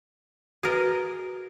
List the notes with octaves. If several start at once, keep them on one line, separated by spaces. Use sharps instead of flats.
F#4 G#4 A#4 B4 D#5